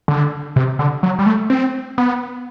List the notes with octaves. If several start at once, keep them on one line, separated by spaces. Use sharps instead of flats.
D3
C3
D3
F#3
G3
A3
C4
B3